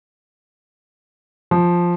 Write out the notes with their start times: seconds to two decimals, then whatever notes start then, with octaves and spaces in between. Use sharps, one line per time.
1.51 F3